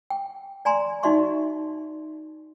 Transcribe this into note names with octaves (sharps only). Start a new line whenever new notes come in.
G5
D5 G#5 A#5 C6
D#4 F#4 D5 E5 C6 C#6